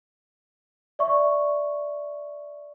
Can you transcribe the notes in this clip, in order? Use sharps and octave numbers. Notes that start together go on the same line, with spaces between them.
D5 E5 C#6